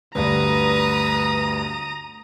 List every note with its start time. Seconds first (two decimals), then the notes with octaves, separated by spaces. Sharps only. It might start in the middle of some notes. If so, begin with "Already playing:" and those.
0.15 D2 G2 D3 B4 A#5 D#6